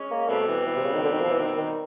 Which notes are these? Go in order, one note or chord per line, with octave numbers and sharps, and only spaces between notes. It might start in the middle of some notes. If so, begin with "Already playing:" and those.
Already playing: G#3 C#4
A#3
B2 G3 A3 C4
E3
E3
C3
C#3
D#3
D3
D#3
F3
E3
D#3
D#3